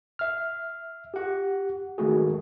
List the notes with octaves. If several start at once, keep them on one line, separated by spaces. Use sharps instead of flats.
E5 F6
G4 F#5
D#3 G#3 A3 F#4 G#4